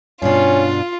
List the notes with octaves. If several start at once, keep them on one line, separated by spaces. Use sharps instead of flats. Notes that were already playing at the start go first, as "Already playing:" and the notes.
G2 B2 C#4 D4 F4